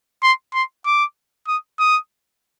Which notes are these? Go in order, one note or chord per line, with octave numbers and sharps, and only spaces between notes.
C6
C6
D6
D#6
D#6